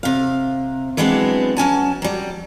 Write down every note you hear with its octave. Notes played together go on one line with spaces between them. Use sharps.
C3 F5
E3 F#3 G#3 B3 C4 D4
F#3 C#4 G#5 A5
F#3 G3